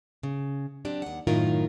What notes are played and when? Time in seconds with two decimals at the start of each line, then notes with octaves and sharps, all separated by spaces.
0.23 C#3
0.85 F#3 C4 D4 G4
1.02 D#2 F#5
1.27 F#2 A2 D#3 F4 A#4